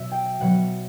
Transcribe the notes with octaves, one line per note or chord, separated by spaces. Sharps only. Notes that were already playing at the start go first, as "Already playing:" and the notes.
Already playing: B2 F#3 E5
G5
B2 F#3 F#5